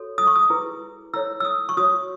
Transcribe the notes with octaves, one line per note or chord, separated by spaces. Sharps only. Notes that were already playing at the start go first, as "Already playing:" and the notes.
Already playing: F#4 A4 C#5
D#6
C#6
D#6
E4 G#4 B4
E4 A4 C#5 E6
E6
D#6
C#6
F#4 C#5 D#6